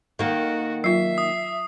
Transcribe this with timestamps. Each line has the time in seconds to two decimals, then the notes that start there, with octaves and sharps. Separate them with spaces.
0.19 D#3 A#3 F#4
0.84 F#3 F4 E5 C7
1.18 D#6